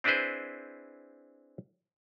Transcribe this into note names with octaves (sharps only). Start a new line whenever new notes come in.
C4 D4 E4 G#4 B4 C5